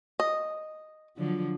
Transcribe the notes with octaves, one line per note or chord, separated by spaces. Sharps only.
D#5
D3 F3 F#3